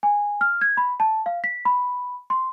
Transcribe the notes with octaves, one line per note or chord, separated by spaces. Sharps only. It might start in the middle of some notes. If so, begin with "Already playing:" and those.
G#5
F6
G#6
B5
A5
F5
B6
B5
C6